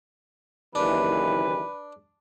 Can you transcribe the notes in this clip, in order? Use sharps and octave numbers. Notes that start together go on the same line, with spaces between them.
F#1 D#2 E3 D4 B4